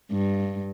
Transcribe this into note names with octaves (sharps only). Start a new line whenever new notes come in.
G2